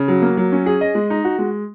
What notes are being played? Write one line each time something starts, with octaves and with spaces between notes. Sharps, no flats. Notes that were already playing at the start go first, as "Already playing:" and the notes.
Already playing: C#3
F#3
A#3
F#3
C#4
G#4
D#5
G#3
D#4
F#4
G#3